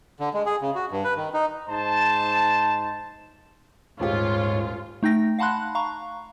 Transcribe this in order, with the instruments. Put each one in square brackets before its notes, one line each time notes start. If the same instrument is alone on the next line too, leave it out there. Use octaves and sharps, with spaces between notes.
[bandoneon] D3
G#3
G#4
C#3
F#4
G2
B4
D#3
D#4
[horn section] G#2 D#4 C5 A5
[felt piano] D#1 G#3 G4 [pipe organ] G#2 C#5 [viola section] F4
[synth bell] A3 D#4 G5 A#6
F5 F#5 A5 B5 C6 F#6
F5 A#5 C#6